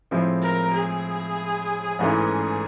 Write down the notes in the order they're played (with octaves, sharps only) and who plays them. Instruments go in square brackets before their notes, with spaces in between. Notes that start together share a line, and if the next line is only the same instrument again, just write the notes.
[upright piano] A2 F3 G#3 C4 E4
[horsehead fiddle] A#4
G#4
[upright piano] A1 G#2 E3 A3 C#4